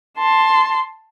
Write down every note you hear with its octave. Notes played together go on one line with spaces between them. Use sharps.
A5 C6